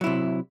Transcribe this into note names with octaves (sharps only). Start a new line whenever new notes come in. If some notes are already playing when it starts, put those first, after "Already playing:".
C3 F#3 E4